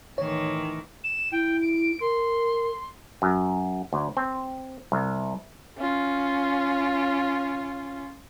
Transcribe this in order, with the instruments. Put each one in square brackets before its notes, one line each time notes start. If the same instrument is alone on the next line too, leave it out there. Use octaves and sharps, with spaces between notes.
[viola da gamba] A2 D#3 E3 [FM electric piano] C#5
[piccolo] E7
[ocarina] E4 [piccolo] G5
[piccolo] D7
[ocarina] A#4 [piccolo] C6
[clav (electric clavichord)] F#2
D2
C4
C2
[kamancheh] C#4 F4